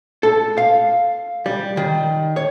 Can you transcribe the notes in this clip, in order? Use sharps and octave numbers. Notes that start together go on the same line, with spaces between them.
A4
F5
G3
D#3
C#5